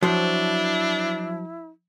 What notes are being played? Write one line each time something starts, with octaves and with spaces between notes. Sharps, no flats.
F3 F#3 D4 E4 C5